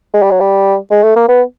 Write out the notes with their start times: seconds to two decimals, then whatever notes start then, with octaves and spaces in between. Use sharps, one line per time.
0.14 G#3
0.22 G3
0.31 F#3
0.40 G3
0.91 G#3
1.03 A3
1.16 A#3
1.29 B3